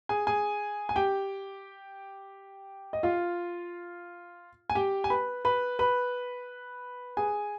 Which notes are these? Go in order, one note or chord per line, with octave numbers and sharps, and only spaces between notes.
G#4 G#5
G#4 G#5
G#5
G4 G5
D#5
F4 F5
G#5
G4 G5
G#5
B4 B5
B4 B5
B4 B5
G#4 G#5